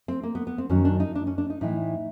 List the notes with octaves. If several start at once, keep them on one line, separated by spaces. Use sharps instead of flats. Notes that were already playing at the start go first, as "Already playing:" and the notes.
C4
A#3
B3
B3
C4
F#2 D#3 F#3 C#4
D4
D#4
D4
C#4
D4
D#4
A2 E3 D#4